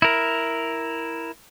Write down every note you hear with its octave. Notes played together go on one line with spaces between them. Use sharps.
E4 A#4